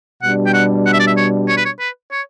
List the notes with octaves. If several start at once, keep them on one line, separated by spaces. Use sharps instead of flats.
B2 G3 D4 F#5
G5
F#5
F#5
E5
D5
E5
C#5
C#5
B4
C#5
B4
C#5